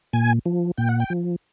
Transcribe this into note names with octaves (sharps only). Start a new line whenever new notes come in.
A#2 G#5
F3
A#2 G5
F#5
G5
F3